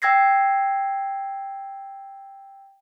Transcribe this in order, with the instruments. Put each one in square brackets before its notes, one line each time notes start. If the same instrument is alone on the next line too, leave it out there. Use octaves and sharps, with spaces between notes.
[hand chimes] G5 E6 G#6 A#6 C7